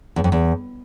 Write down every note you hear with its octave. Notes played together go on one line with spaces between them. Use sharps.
E2
F2
E2